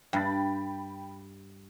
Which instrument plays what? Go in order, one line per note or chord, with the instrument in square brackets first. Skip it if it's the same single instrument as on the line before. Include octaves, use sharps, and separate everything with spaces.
[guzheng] G2 [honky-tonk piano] G5 B5 A6